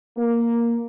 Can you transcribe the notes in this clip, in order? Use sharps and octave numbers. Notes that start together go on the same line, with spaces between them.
A#3